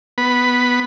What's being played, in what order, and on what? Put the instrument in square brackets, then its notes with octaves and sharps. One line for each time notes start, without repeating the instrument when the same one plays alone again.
[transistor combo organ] B3 B5